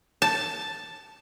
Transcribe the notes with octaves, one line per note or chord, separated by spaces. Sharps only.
A5